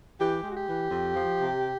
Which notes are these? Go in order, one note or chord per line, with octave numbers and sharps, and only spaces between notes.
E3 G4
G#3
F#4
G4
E3
F2
F3
C3